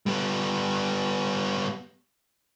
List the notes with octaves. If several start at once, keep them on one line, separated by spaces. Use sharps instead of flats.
G3 B3